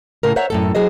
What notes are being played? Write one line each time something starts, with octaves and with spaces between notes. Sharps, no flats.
A2 C#3 A#4
C5 C#5 E5 F#5 A#5
F#2 A2 A4
F#3 G#4 C5 D#5